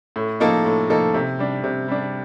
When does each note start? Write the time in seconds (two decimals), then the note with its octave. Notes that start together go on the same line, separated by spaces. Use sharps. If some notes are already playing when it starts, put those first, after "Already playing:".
0.16 A2
0.40 F3 A#3 D#4 A4
0.65 A2
0.90 F3 A#3 D#4 A4
1.14 C3
1.39 G3 D4
1.64 C3
1.88 G3 D4